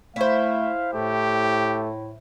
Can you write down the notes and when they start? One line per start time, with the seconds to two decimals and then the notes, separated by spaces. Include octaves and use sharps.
0.16 A3 E4 C5 F5
0.94 A2 A3 G4